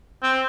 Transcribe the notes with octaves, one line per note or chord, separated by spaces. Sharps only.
C4